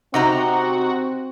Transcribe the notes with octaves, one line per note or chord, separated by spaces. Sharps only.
C3 C4 D#4 F#4 A#5